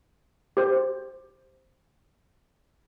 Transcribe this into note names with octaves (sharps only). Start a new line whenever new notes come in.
G4 C5